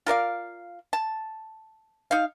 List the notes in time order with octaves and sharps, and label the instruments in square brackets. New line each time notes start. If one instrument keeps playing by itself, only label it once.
[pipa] F4 A#4 D5 F5
A5
D#4 F5